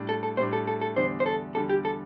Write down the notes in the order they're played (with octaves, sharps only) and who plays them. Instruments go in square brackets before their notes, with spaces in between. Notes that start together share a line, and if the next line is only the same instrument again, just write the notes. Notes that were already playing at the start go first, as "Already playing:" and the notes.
Already playing: [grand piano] A2 G3 D4
[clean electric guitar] A4
A4
[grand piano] A2 G3 D4 [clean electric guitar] C5
[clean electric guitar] A4
A4
A4
[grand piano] E2 D3 G3 D4 [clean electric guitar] C5
[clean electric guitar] C5
A4
[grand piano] E2 D3 G3 D4 [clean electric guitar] A4
[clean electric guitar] G4
A4